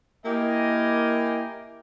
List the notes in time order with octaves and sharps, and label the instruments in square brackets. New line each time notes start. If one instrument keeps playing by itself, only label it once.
[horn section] A#3 E4 G4 A#4 D#5 G#5